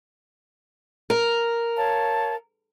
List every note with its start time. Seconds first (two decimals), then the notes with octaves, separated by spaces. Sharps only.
1.10 A#4
1.76 C#5 F5 A5